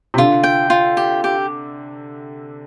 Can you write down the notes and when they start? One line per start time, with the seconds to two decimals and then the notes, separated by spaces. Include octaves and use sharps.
0.14 C3
0.18 D3 F4
0.43 G5
0.70 F4
0.97 G4
1.24 G4